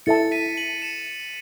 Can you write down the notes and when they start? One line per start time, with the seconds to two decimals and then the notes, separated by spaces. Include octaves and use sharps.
0.06 E4 A4 E5 A5 A6 C#7
0.31 B6 D#7
0.57 D#7 F#7
0.82 C#7 E7